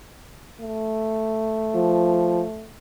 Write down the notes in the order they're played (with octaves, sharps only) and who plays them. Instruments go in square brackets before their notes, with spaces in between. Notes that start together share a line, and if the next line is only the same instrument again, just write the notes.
[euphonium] A3
[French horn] F3